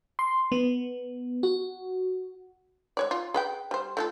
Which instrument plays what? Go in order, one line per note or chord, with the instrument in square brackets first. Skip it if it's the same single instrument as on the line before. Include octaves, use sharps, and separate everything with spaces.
[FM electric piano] C6
B3
F#4
[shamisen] G#3 C#5 D5
F4
G#4 B4 G5
G3 C5
A3 F4 A4